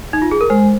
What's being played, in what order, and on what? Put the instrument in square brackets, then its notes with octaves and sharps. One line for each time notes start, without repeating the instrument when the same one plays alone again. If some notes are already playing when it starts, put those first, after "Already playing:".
[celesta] D#4
F4
G#4
A#4
[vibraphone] G#3 [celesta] C5